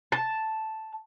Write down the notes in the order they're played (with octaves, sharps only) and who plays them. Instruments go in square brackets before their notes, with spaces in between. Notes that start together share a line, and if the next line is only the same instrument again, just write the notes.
[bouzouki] A5